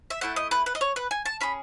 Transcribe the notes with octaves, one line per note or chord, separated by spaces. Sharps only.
E5
A3 E4 A4 F#5
D#5
B4
B4
D#5
C#5
B4
G#5
A5
C#4 G#4 B5